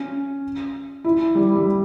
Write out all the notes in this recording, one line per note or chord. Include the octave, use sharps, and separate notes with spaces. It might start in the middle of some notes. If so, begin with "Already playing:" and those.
Already playing: C#4
E4
G3
G3